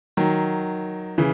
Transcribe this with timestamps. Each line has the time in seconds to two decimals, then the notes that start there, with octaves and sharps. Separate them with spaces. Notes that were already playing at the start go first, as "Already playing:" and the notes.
0.17 D#3 F#3
1.18 C#3 E3